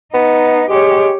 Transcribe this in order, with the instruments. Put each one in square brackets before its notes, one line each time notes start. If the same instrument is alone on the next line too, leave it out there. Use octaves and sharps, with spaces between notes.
[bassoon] B3 [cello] D#4
[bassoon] G#3 [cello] G4 C#5